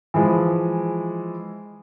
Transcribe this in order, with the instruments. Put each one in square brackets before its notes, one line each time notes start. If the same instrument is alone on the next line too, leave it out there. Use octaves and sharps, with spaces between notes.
[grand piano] E3 F3 G#3